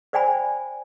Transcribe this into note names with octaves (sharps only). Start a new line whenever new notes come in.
C5 D5 G5 G#5 B5